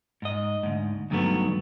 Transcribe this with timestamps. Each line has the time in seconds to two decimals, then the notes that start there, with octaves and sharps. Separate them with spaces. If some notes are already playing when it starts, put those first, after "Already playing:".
0.22 G#2 D#5
0.63 D2 G#2
1.10 D2 G2 D#3 F#3 A3 B3